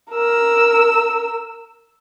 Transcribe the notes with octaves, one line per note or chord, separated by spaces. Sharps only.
A#4 E6